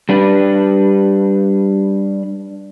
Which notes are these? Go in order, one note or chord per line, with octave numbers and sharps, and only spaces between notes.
G3 D4 B4